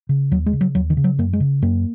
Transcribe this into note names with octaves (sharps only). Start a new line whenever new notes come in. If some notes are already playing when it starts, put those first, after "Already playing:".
C#3
D#2 F#3
G#3
C#3
F#3
D#2 F#3
D#3
C#3
F#3
F#2 A#3
G#3
C#3
F#2 A#3